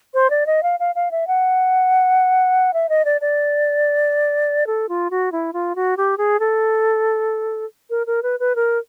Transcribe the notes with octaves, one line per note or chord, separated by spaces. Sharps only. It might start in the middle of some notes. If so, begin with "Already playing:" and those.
C5
D5
D#5
F5
F5
F5
E5
F#5
E5
D#5
D5
D5
A4
F4
F#4
E4
F4
F#4
G4
G#4
A4
A#4
A#4
B4
B4
A#4